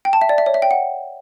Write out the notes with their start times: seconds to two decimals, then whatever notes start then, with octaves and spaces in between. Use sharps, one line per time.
0.05 G5
0.13 A5
0.21 E5
0.29 D5
0.38 E5
0.46 C#5
0.54 E5
0.62 G5
0.71 F#5